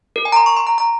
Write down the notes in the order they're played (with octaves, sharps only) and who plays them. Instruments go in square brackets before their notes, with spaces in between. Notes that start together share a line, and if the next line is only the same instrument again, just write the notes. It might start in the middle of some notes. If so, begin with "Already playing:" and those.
[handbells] A#4
G#5
A#5
C6
C#6
C6
A#5
A#5